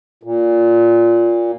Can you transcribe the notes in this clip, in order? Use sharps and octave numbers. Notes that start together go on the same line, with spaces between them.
A#2